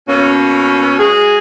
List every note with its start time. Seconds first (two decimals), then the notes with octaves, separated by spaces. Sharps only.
0.07 B2 A#3 C#4
0.98 G#3 F#4 G#4